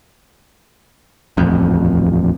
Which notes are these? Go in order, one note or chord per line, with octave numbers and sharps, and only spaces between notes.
D#1 A1 F2